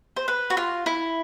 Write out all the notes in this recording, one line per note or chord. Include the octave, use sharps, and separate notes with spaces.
C5
B4
F#4
F4
E4